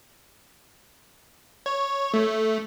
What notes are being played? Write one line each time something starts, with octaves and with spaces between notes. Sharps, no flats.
C#5
A3